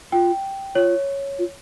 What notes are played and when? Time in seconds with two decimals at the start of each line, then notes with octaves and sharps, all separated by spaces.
0.12 F4 G5
0.75 F4 C#5
1.39 F4